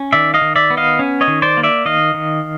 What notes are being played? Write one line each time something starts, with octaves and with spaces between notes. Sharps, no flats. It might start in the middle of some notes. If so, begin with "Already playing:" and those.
Already playing: C#4
D#3 D5 E5
D#5 F5
D#3
D5 E5
B3
D#5 F5
C#4
C#5 D#5
D#3
C5 D5
A#3
D5 E5
D#3 D#5 F5
D#3